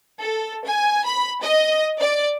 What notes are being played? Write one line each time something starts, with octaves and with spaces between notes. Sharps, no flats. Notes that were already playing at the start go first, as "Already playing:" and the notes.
A4
G#5
B5
D#5
D5